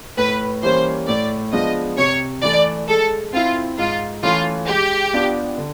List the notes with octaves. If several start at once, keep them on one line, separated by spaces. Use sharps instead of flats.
A2 B4
E3 G3 A#3 C#4 C5
A2 D5
F3 G#3 B3 D4 D#5
C3 C#5
E3 A3 D5
G#3 A4
C4 E4 F4
G#2 F4
E3 A3 C#4 F4
G#3 G4
B3 D4 F4
D3